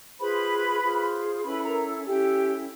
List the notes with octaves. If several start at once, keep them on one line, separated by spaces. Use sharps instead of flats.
F4 G#4 B4 C5 B5
F4 G#4 C5
C#4 E4 A4 B4 B5
A#4 A#5
C#4 E4 G4 A4 G5